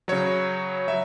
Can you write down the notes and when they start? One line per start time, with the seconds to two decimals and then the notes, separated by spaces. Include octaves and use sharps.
0.08 C#3 F#3 C#5
0.88 F#3 E5